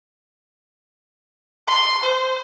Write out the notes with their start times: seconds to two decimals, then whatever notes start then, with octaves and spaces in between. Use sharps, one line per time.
1.68 C6
2.03 C5